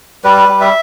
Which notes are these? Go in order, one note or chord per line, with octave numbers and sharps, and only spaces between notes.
G3 B4
G3
E5